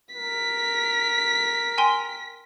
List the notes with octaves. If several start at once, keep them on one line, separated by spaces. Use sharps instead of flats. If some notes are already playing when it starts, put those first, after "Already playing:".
A#4 B6
G5 G#5 C6